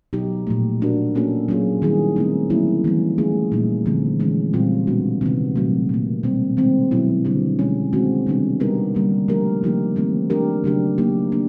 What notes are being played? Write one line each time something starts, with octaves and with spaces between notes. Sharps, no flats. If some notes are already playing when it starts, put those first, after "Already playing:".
B2 F#3 B3 D#4 G4
A#2 F3 A3
A3 D4 F#4 A#4
F#3 A#3 C#4 F#4 A4
F#3 A#3 C#4 F4 G#4
D#3 G3 B3 E4 G#4
A3 C4 D#4
D3 F#3 A#3 C#4 E4
E3 G3 B3
A3 C#4 F4 G#4
A#2 G3 A#3 D#4
D3 F3 A3 C4
E3 G#3 C#4
A#2 G3 C4 F4
B2 G#3 B3 D4 F#4
C3 D#3 G#3 B3
A#2 F#3 A3
A#2 F#3 A#3
B2 G3 C4
D#3 G#3 C4
B2 F#3 B3 E4
D3 G3 B3 D4 G4
B2 G#3 C#4
D#3 G#3 C4 D#4 F#4
C3 D#3 G3 B3 D4
G3 B3 D#4 G4 A#4
D3 G3 A#3
F3 A3 D4 G4 A#4
C#3 F3 A#3 D#4 G4
D#3 F#3 A3 C4
F3 A3 D4 G4 A#4
C#3 F#3 A3 D4 G4
F#3 A#3 D#4 G4
A#3 D4